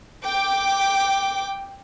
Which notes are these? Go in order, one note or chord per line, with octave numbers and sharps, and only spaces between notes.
G5 D6